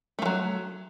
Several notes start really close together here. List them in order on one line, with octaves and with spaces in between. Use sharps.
A3 F3 F#3